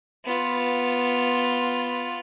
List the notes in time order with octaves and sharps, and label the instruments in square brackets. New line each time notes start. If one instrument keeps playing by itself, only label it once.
[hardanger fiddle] B3 F4